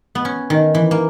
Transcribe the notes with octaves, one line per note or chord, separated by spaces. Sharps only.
B3
C#4
D#3
E3
A#3